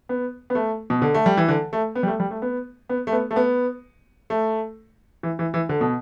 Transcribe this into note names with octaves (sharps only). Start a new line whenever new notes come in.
B3
B3
A3
B2
D3
A3
G3
E3
D3
A3
B3
G3
A3
G3
A3
B3
B3
A3
B3
A3
B3
A3
E3
E3
E3
D3
B2